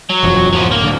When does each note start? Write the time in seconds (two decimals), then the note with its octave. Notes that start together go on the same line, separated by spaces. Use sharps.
0.10 F#3
0.23 E1 F#2 F3
0.53 D1 F3 F#3
0.71 A#3
0.84 D1 D3